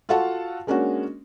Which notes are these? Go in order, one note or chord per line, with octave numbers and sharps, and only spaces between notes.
F4 F#4 A4 F5 F#5 A5
G#3 A#3 C#4 D4 F#4